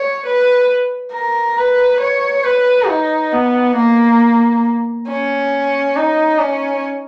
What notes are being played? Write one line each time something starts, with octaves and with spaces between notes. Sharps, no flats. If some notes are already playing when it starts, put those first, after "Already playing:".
Already playing: C#5
B4
A#4
B4
C#5
B4
D#4
B3
A#3
C#4
D#4
C#4